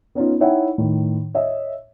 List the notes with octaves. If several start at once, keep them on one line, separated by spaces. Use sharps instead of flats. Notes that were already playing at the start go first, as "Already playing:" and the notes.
B3 C#4 D#4 F4
D#4 E4 C#5 E5 F#5 G5
A2 D#3
C#5 D#5 E5